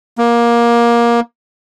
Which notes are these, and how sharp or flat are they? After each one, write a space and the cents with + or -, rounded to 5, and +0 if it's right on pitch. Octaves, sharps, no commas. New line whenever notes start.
A#3 +20